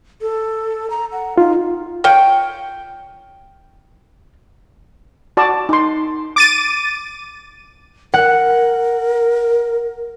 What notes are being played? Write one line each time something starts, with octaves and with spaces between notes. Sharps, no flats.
A4
A#5
F#5
D#4 F4
F4 C#5 G5
F#4 D5 A5
D#4 C6
D6 A6 D#7
A#4 F#5